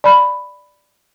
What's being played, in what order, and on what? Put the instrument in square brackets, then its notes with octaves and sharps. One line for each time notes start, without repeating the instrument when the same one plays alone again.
[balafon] D5 B5